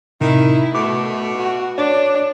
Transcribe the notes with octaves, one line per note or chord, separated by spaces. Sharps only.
A2 C3 D#3 E4
B2 A3 D6
F#4
D4 C#5